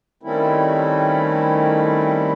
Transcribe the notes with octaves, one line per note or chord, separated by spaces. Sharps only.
D#3 G3 A3 C4 C#4 E4